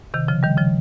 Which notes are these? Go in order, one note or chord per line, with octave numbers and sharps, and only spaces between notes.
C3 D#3
C#3 F3
D#3 G3
C#3 F3